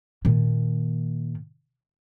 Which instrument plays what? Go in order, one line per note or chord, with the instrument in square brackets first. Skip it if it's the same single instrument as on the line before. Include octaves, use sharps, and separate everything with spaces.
[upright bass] A#2 D#3